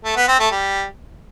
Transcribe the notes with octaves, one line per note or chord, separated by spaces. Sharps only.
A3
B3
C4
A3
G3